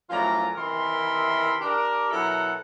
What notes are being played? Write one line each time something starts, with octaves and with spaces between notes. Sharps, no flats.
F#2 A2 F3 F4 D5 A#5
C3 D#3 E3 A#4 B5 C6
D4 G4 A#4
B2 F#3 E4 A4 A#4 F#5